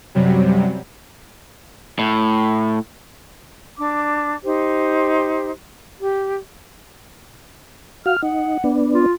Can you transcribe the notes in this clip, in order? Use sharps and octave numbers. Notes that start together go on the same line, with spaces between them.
F#2 C3 F#3 G3
A2
D4 D6
D#4 G4 C5
G4
F#4 F5 F6
D#4 F#5
B3 D4
F4